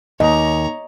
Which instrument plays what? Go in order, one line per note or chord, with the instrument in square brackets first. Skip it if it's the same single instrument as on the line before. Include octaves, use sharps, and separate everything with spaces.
[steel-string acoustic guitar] D#2 [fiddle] C#5 A#5 [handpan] D#5